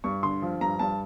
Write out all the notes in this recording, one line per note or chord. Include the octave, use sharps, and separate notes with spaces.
G2 C#6
D3 C6
F3
G2 A#5
G2 A5